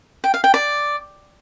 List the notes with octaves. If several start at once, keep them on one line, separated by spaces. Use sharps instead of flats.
G5
F5
G5
D5